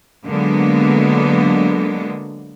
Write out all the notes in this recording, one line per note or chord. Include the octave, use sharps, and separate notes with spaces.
D3 F#3 G#3 A#3 B3